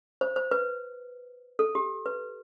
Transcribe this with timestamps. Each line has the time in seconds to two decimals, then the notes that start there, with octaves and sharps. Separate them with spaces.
0.21 C5
0.36 C5
0.51 B4
1.59 A4
1.75 G4
2.06 B4